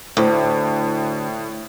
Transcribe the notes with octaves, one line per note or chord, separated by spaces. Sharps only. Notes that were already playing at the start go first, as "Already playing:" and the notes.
D2 A2